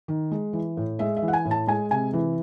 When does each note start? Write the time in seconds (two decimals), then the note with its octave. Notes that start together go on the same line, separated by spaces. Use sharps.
0.08 D#3
0.31 G#3
0.53 E3
0.77 A2
0.99 G#3 E5
1.17 E5
1.22 E3
1.28 F#5
1.33 G#5
1.45 A2
1.51 A5
1.67 G#3 G#5
1.91 C3 G#5
2.13 E3